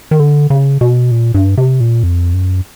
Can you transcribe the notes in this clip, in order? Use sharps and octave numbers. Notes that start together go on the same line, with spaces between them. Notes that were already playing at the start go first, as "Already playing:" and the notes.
D#3
D3
C#3
B2
A#2
G2
C3
A#2
F2
F#2